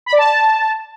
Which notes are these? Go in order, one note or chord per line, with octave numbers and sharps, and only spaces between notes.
B5
D5
A5